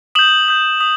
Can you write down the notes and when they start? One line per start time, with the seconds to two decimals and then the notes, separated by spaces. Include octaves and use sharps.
0.15 D#6 G6 E7 F#7
0.48 D#6 G6
0.81 D#6